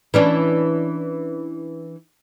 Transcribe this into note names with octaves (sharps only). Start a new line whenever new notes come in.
E3 C#4 D4